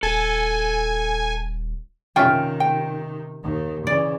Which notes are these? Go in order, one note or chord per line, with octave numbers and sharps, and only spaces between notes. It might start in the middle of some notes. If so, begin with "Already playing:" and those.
D#1 A4 G#5
C3 D#3 A#3 C#4 F4 E5 G5
G5
D#2 D#3
C#3 E3 D5